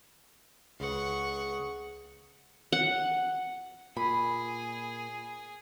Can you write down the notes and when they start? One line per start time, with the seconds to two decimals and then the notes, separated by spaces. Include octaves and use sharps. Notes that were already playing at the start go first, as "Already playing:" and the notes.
0.80 C#2 G#4 B4 F#5 C#6
2.72 F#5
3.97 A#2 G#4 B5